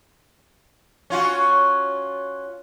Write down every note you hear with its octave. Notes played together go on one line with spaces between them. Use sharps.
C#4 F4 F#4